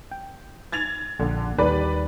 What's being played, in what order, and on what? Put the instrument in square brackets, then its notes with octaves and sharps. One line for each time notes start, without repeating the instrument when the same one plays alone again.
[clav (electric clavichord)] G5
[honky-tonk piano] G#6 A6 F7
[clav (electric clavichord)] A#1 [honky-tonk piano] D3
[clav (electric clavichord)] D#2 G3 [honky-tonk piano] B4 D5